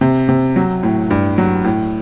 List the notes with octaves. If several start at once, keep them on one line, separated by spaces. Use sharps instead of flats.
C3
C3
F#3
A2
G2
F#3
A2